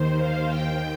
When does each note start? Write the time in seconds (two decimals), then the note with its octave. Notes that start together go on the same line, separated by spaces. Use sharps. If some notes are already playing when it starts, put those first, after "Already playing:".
Already playing: D#2 D#3 C5
0.19 F5
0.48 D#2 D#3 G5